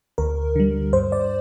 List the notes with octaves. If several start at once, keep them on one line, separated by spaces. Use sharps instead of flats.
D2 A#4
D3 G3
G2 C5
D5